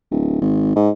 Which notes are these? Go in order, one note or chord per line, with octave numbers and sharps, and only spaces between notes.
D1
G#1
G#2